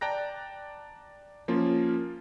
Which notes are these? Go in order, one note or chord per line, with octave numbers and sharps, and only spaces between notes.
D5 G5 A5 A#5 F#6 A#6
F3 A#3 C#4 F4